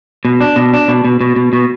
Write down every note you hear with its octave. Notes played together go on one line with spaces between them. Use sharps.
B2
D4
B2
D4
B2
B2
B2
B2
B2